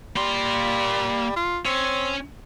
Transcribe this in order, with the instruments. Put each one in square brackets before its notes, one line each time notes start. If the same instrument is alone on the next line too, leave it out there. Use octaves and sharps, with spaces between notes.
[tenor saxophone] G3 [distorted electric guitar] A#3 C6
[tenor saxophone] F4
[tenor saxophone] C4 [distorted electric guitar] C#4